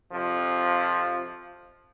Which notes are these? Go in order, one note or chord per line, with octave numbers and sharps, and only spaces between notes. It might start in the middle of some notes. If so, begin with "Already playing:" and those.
F2 C3 F3